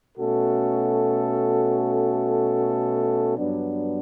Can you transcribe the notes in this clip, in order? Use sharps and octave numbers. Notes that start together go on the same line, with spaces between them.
B2 A3 C#4 F#4 A4
G2 F#3 B3 D4